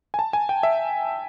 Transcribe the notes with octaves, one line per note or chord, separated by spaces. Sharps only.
G#5
A5
G#5
G5
E5